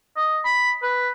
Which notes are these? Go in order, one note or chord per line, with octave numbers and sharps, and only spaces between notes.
D#5
B5
B4